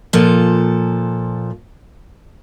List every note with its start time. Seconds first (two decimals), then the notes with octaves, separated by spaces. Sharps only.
0.13 A#2 F3 A4